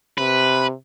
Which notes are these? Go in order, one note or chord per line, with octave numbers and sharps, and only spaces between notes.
C3 B4